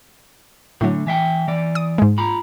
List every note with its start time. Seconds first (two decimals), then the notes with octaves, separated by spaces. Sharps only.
0.81 A2 D3 F#3 A3
1.07 E3 E5 G5
1.48 E3 D5
1.75 D#6
1.98 G#2 G#3
2.18 F4 A#5 B5